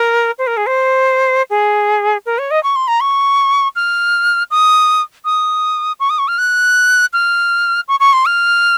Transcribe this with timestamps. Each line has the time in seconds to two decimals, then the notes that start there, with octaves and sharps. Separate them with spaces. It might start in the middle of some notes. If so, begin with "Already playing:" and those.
Already playing: A#4
0.38 C5
0.47 A#4
0.57 G#4
0.66 C5
1.50 G#4
2.26 A#4
2.38 C#5
2.51 D#5
2.63 C#6
2.76 C6
2.88 A#5
3.00 C#6
3.76 F6
4.51 D#6
5.25 D#6
6.00 C#6
6.10 D#6
6.19 C#6
6.28 F6
6.38 F#6
7.13 F6
7.88 C#6
8.00 C#6
8.13 C6
8.26 F6